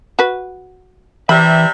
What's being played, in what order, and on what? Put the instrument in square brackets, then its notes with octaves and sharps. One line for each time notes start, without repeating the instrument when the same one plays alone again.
[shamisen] F#4 B4
[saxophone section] C3 G3 E5 [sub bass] E3 [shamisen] B5